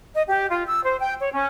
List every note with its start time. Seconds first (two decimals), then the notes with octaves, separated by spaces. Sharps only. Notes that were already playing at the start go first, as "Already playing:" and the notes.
0.14 D#5
0.28 G4
0.50 F4
0.67 E6
0.83 C5
1.00 G5
1.20 C#5
1.33 C#4